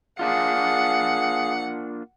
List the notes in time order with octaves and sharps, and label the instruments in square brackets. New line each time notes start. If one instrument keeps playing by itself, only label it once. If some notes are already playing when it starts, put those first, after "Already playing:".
[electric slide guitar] A#3 D4 F4 [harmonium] G#4 F5 [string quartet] F#5